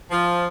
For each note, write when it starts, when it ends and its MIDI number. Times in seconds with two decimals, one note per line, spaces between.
0.10 0.45 53